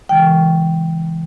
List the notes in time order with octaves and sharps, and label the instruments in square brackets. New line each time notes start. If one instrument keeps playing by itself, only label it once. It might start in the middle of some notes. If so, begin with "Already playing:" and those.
[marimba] C#3 E3 G#3 G5